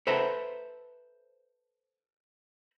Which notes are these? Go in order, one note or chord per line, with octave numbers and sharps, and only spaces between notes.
A4 B4 C5 E5 A5 A#5